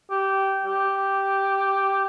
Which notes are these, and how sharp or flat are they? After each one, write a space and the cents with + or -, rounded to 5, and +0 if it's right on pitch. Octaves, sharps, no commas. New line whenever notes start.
G4 -15
G4 -5